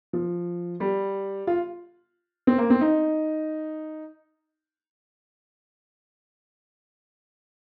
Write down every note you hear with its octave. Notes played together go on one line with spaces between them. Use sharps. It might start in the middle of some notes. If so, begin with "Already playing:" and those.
F3
G3
F4
C4
A#3
C4
D#4